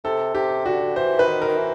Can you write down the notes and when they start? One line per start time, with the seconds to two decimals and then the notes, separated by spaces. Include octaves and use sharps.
0.05 C3 A4
0.35 C3 G4
0.66 D3 F#4
0.96 E3 C5
1.19 B4
1.26 D#3
1.42 A#4
1.48 D#3
1.57 E3